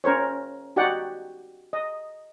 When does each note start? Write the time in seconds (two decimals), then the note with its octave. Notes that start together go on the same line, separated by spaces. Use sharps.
0.04 C#4 A#4 C5 C#5
0.76 D#4 F#4 G4 D5 F#5 G5
1.73 D#5